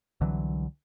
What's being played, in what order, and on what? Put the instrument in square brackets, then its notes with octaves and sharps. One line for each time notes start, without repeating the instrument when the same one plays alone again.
[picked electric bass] C2 D3 E3 F#3